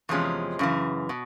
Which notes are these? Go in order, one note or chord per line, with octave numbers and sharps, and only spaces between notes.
E2 C3 F3 G#3 C#4
F#2 C#3 E3
B2